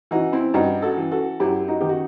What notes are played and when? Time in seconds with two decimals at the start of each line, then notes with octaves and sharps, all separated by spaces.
0.11 E3 D#4 F#4
0.33 C4 E4
0.54 G2 D#4 F#4
0.82 F#4 A4
0.97 E3
1.11 F#4 A4
1.40 F#2 E4 G4
1.68 D#4 F#4
1.80 D#3 G4
1.89 F#4